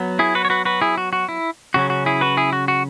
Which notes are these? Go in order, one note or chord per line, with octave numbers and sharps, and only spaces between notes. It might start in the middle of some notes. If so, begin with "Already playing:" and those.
Already playing: F#3 B3
E4 G#4
F#4 B4
C#5
F#4 B4
F#4 B4
E4 G#4
F#4
F#4
E4
C#3 F#3 C#4 F#4
F#4
E4 G#4
F#4 B4
E4 G#4
F#4
F#4